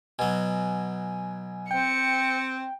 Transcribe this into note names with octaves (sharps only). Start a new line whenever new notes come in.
B2 F#3 G#5
C4 G5 C#7